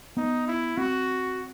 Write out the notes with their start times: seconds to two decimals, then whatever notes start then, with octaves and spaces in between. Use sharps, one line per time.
0.17 B3 D#4
0.48 E4
0.77 C4 F#4